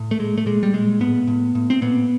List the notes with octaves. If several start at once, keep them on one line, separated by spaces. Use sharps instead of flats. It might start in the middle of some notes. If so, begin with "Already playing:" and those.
Already playing: A2
A3
A#2 G#3
A3
A#2 G#3
G3
A#2 G#3
A2 B3
A2
A2
C4
A#2 B3